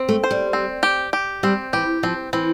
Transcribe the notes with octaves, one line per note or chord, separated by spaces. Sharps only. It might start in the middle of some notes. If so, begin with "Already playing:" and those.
Already playing: C4
A3
C5
G3
C4
G4
G4
G3 C4
E3 G4
F3 C4
E3 C4